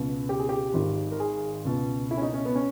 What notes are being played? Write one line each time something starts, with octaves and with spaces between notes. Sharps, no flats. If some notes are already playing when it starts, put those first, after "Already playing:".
Already playing: C#2 B2
G4
G#4
G4
G#1 G#2 D#3
A#4
G#4
C#2 B2
E4
C#4
D#4
C#4
B3
C#4